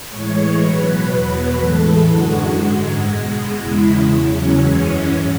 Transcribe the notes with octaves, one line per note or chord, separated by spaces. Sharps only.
A2 E3 G#3 C#5
B2 F#3 B4
E2 B2 F#3 B4
A2 E3 G#3 A4
F#2 D3 G#3 F#4
G#2 G#3
B2 G#3
E2 C#3 G#3 E4
E2 C#3 F#3 C#4
F#2 E3 G#3
G#2